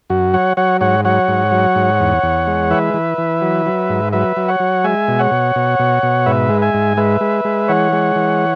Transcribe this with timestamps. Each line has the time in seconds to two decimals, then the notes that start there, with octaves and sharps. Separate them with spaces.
0.10 F#2 F#4
0.33 F#3 C#5 F#5
0.57 F#3 C#5 F#5
0.81 G#2 C#5 F#5
1.05 F#3 C#5 F#5
1.28 G#2
1.52 F#3
1.76 G#2
2.00 E2
2.23 E2
2.47 G#3
2.70 E3 B4 E5
2.94 E3
3.18 E3
3.42 F#3
3.66 F#3
3.90 G#2
4.12 F#3 B4 E5
4.37 F#3
4.48 C#5 F#5
4.60 F#3
4.84 G#3 E5 G#5
5.08 B2
5.19 C#5 F#5
5.31 B2
5.56 B2
5.79 B2
6.03 B2
6.26 G#2 B4 E5
6.50 G#3
6.62 E5 G#5
6.74 G#2
6.97 G#3 B4 E5
7.21 G#3
7.45 G#3
7.68 E3 C#5 F#5
7.93 G#3
8.16 E3